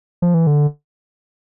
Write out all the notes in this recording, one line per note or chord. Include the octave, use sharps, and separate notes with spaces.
F3
E3
D3